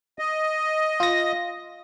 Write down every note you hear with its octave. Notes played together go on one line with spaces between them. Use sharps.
D#5
F4 A#6